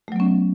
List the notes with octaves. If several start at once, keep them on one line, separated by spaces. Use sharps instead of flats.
F#3 A3 B3 C#4